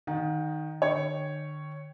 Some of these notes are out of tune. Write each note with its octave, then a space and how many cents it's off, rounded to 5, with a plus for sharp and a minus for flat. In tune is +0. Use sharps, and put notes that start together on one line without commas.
D#3 +0 D#4 +0 F#5 -45
D3 +45 C#5 +0 G5 -5